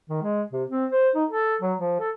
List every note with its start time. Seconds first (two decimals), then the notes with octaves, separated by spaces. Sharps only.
0.10 D#3
0.23 G#3
0.53 C3
0.70 C4
0.92 C5
1.15 D#4
1.30 A4
1.62 F#3
1.79 F3
2.00 A4